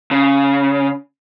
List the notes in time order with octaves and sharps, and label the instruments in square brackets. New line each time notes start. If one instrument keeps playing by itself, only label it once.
[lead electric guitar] C#3